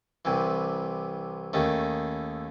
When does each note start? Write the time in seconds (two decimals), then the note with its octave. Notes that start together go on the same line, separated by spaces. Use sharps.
0.25 C2 C3 E3
1.53 D#2 D#3 A3 C#4